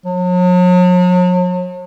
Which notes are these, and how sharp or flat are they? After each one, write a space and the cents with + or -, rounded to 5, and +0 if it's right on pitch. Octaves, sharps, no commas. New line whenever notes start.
F#3 -45